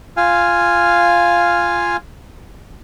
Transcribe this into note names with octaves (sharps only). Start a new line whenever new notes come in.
F4 F5 G#5